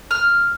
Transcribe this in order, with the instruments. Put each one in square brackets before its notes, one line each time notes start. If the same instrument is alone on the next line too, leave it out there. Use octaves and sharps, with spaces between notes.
[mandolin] F6